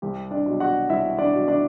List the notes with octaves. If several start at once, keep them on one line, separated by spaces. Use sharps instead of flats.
C2 G4
D4 D5
B2 F#3
F#4 F#5
C2 E4 E5
D4 D5
B2 F#3
D4 D5